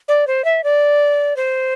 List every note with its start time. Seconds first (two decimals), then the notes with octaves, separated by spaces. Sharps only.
0.08 D5
0.27 C5
0.45 E5
0.64 D5
1.36 C5